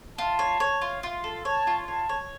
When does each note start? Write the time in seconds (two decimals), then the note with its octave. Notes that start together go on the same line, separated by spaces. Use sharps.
0.18 F4 A5
0.39 C#5
0.60 C#5
0.82 F4
1.03 F4
1.24 A4
1.45 C#5 A5
1.67 F4
1.88 C#5 A5
2.09 C#5